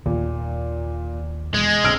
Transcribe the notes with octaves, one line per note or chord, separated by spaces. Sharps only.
D#2 A#2
E1 G#3
A#1 D3 C4 E6 F6 D7